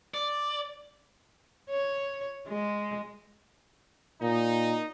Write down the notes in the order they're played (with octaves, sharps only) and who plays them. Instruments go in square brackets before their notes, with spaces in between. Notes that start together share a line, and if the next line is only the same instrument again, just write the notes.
[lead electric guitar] D5
[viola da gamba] C#5
G#3
[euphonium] A#2 [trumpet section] D#4